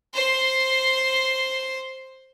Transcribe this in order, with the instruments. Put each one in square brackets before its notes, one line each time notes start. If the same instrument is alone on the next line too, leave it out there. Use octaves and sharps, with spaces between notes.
[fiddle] C5 C6